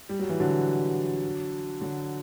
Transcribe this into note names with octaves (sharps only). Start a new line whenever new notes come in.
G3
F#3
E3
D3 F#3
D3 F#3